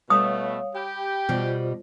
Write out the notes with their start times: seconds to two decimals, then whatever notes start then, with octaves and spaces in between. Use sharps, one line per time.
0.10 B2 A3 C#5 F5 D#6
0.75 G4 G5 B5
1.29 B2 G3 F4 C5 D5 D#5